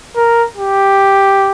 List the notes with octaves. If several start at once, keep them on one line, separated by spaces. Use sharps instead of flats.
A#4
G4